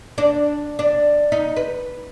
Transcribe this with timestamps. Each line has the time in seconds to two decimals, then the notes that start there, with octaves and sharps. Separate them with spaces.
0.18 D4
0.79 D4
1.32 D#4
1.57 B4